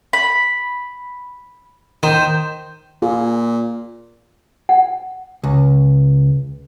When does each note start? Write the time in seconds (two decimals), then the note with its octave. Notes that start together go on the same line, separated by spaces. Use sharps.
0.13 B5
2.03 D#3 C5
3.02 A#2 F4 G#4
4.69 F#5
5.44 C#2